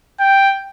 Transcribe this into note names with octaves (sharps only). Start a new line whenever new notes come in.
G5